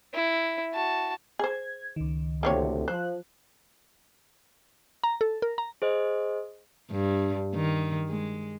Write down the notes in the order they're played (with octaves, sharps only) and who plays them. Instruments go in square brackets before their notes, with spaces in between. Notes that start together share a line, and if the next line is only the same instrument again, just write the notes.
[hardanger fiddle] E4
F#4 A5
[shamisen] G#4 C5 [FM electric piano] G#6
[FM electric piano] C#2 D#3
[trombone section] D2 A2 C3 [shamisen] A#3 C4 C#5
[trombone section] F3 [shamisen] C5 [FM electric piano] F#6
[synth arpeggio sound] A#5
A4
A#4
A#5
[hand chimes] G#4 C5 D#5
[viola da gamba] G2
D#3
G#3